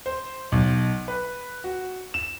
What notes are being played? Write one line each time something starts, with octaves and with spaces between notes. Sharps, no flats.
C5
B1
B4
F#4
E7